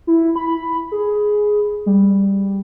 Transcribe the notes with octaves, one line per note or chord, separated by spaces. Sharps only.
E4
B5
G#4
G3